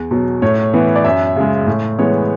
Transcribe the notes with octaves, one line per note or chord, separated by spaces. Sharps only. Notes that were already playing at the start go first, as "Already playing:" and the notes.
Already playing: E2
B2 F#3
A2 C#5
E3 B3
D5
F#2 E5
C#3 G#3
A2
E3 G#3 B3 C#5